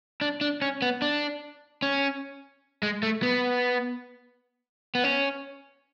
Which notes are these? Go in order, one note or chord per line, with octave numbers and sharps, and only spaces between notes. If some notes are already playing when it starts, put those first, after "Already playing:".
D4
D4
C#4
B3
D4
C#4
G#3
A3
B3
B3
C#4